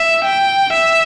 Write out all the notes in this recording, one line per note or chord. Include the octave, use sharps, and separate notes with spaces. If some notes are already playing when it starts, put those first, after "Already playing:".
Already playing: E5
G5
E5